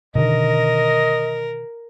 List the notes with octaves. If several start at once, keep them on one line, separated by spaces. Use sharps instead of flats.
B2 D3 D#3 A#4 D#5